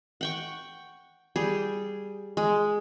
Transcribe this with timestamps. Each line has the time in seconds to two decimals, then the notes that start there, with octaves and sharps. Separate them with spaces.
0.21 F#5 G5 C#6
1.36 G3 G#4
2.37 G#3